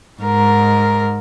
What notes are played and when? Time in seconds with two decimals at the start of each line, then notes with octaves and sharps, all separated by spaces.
0.21 G#2 A#4